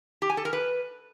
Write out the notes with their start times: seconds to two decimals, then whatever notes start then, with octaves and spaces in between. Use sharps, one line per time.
0.22 G4
0.30 G#5
0.37 A4
0.45 A#4
0.53 B4